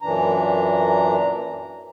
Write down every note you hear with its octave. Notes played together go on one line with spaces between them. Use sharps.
F#2 A#2 E3 D4 A#5